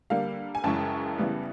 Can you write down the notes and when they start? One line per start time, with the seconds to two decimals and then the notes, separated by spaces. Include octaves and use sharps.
0.10 D3 G3 A#3 F5
0.55 G#5
0.64 F#2 C#3 E3 G#3 C#4 G5 A5
1.18 C#3 E3 G3 B3